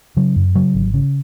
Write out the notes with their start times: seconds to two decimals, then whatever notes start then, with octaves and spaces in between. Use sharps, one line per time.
0.17 C#3 F#3
0.36 F#2
0.55 C#3 F#3
0.74 G#1
0.94 C#3